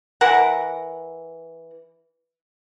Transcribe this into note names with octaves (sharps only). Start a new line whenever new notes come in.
E3 A#4 F#5